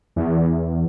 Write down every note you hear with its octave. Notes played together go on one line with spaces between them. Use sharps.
E2